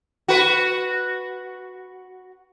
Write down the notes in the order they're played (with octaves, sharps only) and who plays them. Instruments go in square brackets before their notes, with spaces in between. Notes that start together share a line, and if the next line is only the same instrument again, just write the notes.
[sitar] F#4 B4